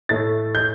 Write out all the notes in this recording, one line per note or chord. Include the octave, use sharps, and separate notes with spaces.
A2 A3 A6
G6